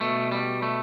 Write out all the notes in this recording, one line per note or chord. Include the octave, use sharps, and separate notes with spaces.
B2 A3
G3
A3